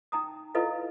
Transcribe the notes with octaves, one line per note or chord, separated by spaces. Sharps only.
D#4 G5 A#5 D#6
E4 F4 A4 B4 D#5 F5